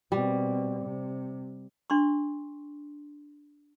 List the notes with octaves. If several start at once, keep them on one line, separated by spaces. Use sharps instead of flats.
B2 G3 C4
C3
D4 C6 C#6